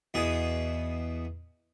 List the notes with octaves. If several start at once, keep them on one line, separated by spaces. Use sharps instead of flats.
E2 B2 G#4 D#6